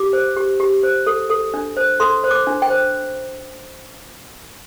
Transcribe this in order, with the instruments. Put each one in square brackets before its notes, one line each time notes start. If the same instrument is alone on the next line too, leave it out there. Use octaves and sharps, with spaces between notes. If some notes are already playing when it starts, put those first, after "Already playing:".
Already playing: [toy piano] G4 D6
C5
G4
G4
C5
A4
A4
D4
C5
A4 C6
C5
D6
D4
G5
C5